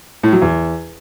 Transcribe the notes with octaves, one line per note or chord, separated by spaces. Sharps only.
A2
F#3
E2